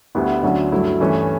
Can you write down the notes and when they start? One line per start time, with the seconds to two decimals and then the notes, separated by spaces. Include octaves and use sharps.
0.15 D2 D3 G3 B3 E4
0.43 D2 D3 F#3 C#4
0.72 G2 F#3 A3 E4
1.00 G2 E3 A3 C#4